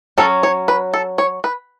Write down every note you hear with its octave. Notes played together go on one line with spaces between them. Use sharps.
F#3 C#4 A4
C#5
B4
A4
C#5
B4